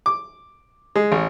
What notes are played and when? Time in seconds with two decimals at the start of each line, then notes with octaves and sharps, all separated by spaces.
0.06 D6
0.96 G#3
1.12 A1